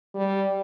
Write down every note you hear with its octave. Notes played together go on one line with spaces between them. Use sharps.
G3